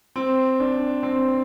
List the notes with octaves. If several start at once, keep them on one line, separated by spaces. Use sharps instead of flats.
C4
D4
C4